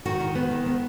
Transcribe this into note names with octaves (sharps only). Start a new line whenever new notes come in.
D#3 F#4
D#3
B3
D#3
B3